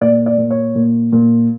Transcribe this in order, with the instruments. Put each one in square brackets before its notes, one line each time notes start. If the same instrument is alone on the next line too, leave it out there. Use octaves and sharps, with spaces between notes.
[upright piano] A#2 D5
D5
A#2
C#5
A#2
A#2